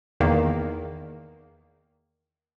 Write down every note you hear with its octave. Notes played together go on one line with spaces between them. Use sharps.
E2 D#3 A#3